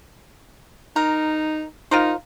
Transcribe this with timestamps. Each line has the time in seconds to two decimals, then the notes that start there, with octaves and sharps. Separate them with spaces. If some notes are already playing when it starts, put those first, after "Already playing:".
0.96 D#4 A#4
1.91 D#4 F4 A#4 C5